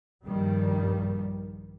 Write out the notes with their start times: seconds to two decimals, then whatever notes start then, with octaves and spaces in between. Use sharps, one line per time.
0.23 A#1 G2 D#3 G3